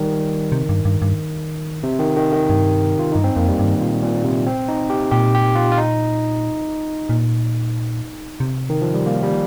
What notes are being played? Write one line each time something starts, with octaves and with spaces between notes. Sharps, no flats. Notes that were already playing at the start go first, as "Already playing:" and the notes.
Already playing: D#3 G3
C3
G2
G2
G2
C3
D#3
D#3
D#3
G2
F4
G2 D#4
C4
F2 A#3
G3
G2 D#3
A#2
A#2
C3
C4
D#4
G4
A#2 G4
G4
F4
F4
D#4
A#2
C3
D#3
F3
G3
A#3
G3